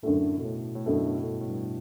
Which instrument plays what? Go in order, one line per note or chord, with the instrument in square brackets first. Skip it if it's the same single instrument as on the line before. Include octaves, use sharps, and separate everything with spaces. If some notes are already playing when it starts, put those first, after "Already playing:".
[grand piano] F#2 D3 A3 [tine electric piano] A2
[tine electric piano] B2
A2
A2
[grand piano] F#2 D3 A3 [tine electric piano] B2
[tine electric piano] A2
G2
A2
G2